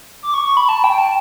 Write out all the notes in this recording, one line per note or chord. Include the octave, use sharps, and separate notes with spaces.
D6
C#6
C#6
B5
A5
G5
A5